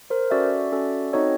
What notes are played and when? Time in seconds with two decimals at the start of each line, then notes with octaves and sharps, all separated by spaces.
0.10 A#4 C5
0.30 C#4 F#4 A4 D5 E5
0.72 C#4 F#4 A4
1.13 C4 D#4 F#4 A4 C#5 D#5